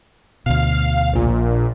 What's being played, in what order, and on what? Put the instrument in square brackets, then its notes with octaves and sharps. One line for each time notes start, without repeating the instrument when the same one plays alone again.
[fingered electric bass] D2 B2 [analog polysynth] F5
[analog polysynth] A#1 A#2